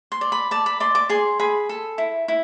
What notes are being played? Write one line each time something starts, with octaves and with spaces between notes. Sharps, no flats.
C6
D5
B5
D5 A5
B5
D5 C6
D6
G#4 C6
G#4 B5
A4
E4
E4